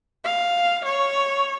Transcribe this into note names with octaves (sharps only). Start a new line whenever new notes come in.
F5
C#5